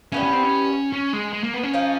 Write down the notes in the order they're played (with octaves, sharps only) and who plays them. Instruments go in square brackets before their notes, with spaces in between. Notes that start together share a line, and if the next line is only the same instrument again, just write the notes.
[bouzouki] G3 B3 E4 [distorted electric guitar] C#4
[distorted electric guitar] C#4
C4
C#4
C#4
G#3
G#3
A#3
B3
C#4
[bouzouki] F3 A#3 D#4